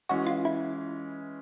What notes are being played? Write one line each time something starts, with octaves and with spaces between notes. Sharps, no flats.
E3 G#3 C#4 F#4
F4
E4